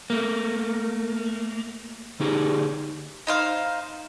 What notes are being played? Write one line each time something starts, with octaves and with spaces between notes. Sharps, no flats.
A3 A#3
D3 D#4 G4 G#4
D#4 C5 F5